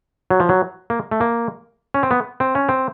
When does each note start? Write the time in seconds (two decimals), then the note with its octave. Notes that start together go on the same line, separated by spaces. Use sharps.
0.30 F#3
0.40 F3
0.49 F#3
0.90 A#3
1.11 A3
1.20 A#3
1.94 C#4
2.03 C4
2.11 B3
2.40 C4
2.55 C#4
2.69 C4